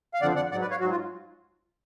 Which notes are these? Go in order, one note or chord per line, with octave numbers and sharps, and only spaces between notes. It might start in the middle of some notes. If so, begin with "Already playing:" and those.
F5
F2 D3 F3 D5 F#5
D5 F#5
G#2 F#3 D5 F#5
B4 D5
C#5 F5
G#2 F#3 F#4
F4